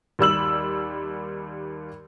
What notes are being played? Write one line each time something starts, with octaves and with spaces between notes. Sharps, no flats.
D#2 G3 E6 F#7